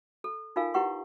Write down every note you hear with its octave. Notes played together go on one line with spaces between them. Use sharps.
A4
D#4 F4 A4 A#4 F5 G#5
E4 G4 B4 F#5 C#6